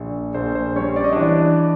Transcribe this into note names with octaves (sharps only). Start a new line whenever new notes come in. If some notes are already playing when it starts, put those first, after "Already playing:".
Already playing: A#1
A#1 C5
C5
G3 C#4 C#5
D5
D#5
E3 D4 D5